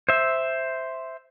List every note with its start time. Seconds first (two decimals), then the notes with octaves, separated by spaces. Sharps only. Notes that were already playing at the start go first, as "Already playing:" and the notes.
0.09 C5 E5